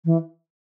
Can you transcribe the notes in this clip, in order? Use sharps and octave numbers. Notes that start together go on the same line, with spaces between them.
E3